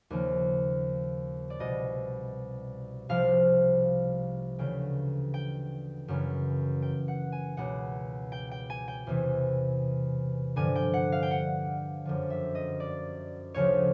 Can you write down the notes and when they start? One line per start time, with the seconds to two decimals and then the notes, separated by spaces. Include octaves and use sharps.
0.10 D#2 C#3 F3
1.50 D5
1.60 C2 B2 D#5
3.09 C2 C3 F3 F5
4.59 D2 C#3 E3 G5
5.34 G5
6.08 F#2 C#3 E3
6.82 G5
7.08 F#5
7.32 G#5
7.57 C#2 B2 F#5
8.32 G5
8.51 G5
8.70 G#5
8.88 G5
9.07 E2 C3 E3
10.56 G2 D3 F3 G#5
10.75 G5
10.94 F#5
11.12 F5
11.23 G5
11.31 F#5
12.05 F#2 D3 F3
12.30 E5
12.55 D#5
12.80 D5
13.54 D2 C#3 F3 C#5